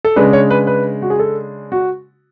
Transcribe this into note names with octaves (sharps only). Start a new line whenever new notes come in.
A4
C#3 G#3 D4 B4
C#5
B4
B4
F#4
G#4
A4
F#4